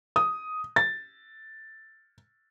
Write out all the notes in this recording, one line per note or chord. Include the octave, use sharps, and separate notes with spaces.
D#6
A6